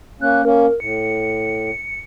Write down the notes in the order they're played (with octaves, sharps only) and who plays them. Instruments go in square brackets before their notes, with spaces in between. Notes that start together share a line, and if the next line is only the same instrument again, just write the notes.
[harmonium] A#3 C#4 [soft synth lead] F#6
[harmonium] A#3 C#4 [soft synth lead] A#4
[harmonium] A2 [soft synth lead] C#7